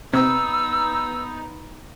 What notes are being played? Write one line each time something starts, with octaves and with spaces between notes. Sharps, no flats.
C3 B3 D#4 E6